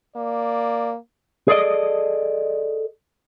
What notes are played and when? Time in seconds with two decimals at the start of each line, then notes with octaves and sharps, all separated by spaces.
0.16 A#3 D5
1.48 G#4 A4 D5 D#5